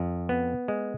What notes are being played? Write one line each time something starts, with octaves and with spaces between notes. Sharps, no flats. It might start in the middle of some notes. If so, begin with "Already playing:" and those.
Already playing: F2
B3
G#3